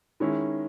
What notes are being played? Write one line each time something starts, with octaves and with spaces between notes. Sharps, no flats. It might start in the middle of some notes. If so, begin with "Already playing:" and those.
D#3 G#3 C#4 E4